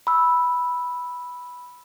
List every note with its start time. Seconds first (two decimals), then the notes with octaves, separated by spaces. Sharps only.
0.07 B5 E6